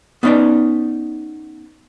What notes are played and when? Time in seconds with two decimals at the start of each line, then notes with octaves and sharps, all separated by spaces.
0.23 B3 C#4 D#4 B4 D5